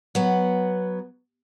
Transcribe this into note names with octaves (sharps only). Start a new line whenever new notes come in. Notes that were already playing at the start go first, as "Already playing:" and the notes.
F#3 B3